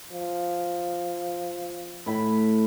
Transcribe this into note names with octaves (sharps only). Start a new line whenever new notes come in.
F3
A2 B5